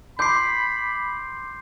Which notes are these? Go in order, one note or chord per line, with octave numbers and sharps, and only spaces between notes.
B5 C6 D6 G6 C7